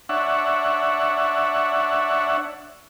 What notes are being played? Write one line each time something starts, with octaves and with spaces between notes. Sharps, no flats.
D4 C#5 E5 F#5